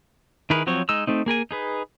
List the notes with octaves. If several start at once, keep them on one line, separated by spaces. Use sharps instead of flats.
D#3 E4 G#4 A#4 B4
F3 F#3 C4 C#5
G#3 D#4 E6
A3 C4 D#4
A#3 G#4 A#4 G#5
D#4 G#4 B4